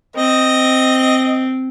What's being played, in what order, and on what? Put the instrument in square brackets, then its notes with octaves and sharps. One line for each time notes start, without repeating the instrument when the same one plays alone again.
[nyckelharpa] C4 [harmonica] D#5